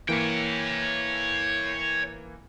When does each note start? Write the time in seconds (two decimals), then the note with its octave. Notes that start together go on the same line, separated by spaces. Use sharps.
0.09 E3 A#3 C#5 G5